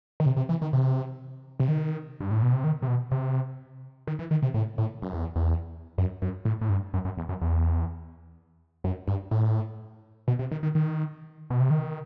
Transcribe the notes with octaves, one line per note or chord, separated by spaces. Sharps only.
D#3
C3
C3
E3
D#3
C3
C3
D#3
G2
A2
B2
C3
D#3
C3
B2
C3
D#3
E3
D#3
C3
A2
A2
F#2
E2
E2
F#2
F#2
A2
A2
G2
F#2
F#2
E2
F#2
E2
F#2
G2
A2
B2
C3
D#3
D#3
D#3
B2
C3
D#3